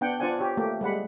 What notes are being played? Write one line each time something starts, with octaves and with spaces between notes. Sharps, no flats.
B3 D4 F#5 G5
D4 F4 C5 D5 F#5 G#5
G4 C#5
A3 A#3 G4
G3 G#3 F#5 B5